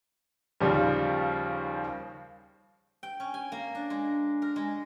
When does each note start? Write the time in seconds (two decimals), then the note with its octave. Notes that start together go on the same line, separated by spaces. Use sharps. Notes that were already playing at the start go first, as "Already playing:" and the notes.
0.60 D#2 C#3 F3 G3
3.03 G5
3.20 C#4
3.34 G#5
3.52 A#3
3.75 D4
3.90 G#3
4.42 A#4
4.56 G#3